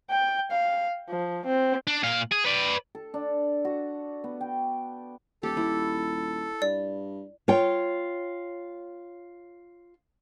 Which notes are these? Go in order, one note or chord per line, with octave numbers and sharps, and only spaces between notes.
G5
F5
F3
C4
D4
A#2 F5
G#4
B4 D5
A4
D4
F#4
B3
G5
D#1 G4 A4
E4
G2 D5
F4 C#5 G5